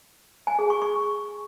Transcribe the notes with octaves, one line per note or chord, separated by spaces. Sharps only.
G#5
G#4
C#6
C#6